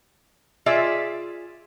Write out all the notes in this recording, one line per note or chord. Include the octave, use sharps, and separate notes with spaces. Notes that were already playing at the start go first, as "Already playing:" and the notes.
F4 G#4 D5 E5